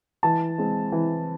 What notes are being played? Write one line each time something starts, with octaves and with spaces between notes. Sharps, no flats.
E3 A5
G#3 C4
E3